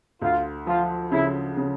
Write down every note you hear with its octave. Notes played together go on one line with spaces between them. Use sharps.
D2 F4
F3 F4
C#3 E4
C#3